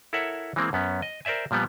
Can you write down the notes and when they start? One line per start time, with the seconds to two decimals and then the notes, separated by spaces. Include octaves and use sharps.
0.13 E4 A4 A#4 C#5 E5 F#5
0.56 E3 G#3 A#3 C4
0.73 F#2 B3 C#4
1.02 D#5
1.25 A#4 C5 D5 E5 G#5
1.51 A#2 F3 G3 B3